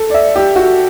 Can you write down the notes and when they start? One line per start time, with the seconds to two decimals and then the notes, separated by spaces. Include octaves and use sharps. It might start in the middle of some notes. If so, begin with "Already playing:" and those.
Already playing: A4
0.10 D5
0.14 E5
0.36 G4
0.56 F#4